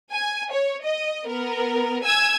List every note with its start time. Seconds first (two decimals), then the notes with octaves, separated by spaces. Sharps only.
0.11 G#5
0.51 C#5
0.84 D#5
1.27 B3 A#4
2.03 G#5 E6 G#6